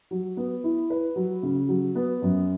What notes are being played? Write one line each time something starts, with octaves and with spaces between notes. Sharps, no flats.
F#3
B3
E4
B4
F#3
C#3
F#3
B3
F#2